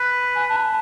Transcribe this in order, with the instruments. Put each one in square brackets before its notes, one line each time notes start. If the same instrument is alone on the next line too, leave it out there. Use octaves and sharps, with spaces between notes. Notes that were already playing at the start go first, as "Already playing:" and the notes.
Already playing: [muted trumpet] B4
[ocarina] G#5
A5
B5
A5